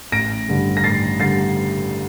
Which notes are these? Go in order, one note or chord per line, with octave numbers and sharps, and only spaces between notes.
A1 A#6 D7
G2 D3 G3
A#6
A1 A6 C7
D3 G3 A6 C7